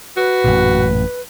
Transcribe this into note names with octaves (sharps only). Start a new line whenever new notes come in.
F#4 B4
A1 F#2 A#2